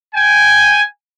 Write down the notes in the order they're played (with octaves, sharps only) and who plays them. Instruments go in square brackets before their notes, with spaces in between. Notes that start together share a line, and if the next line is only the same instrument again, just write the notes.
[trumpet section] G5 G#5